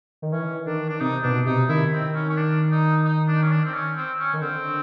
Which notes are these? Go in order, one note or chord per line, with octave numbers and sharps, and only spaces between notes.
D#3
E3 C#4
D#3 D4
D4
C3 D#4
B2 D4
C3 D#4
D#3 E4
C4
C#4
C#4
D4
D#4
D#4
D4
C#4
D4
C4
C#4
C4
C#4
D#3
D3 C4